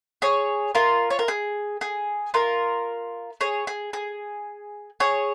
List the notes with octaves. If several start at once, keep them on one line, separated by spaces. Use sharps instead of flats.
G#4 C#5
F4 A#4
C#5
A#4
G#4
G#4
F4 A#4
G#4 C#5
G#4
G#4
G#4 C#5